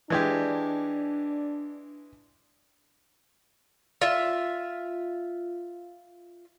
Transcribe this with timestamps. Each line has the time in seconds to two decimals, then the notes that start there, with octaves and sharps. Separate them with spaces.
0.10 E3 G#3 D4 G4
4.01 F4 E5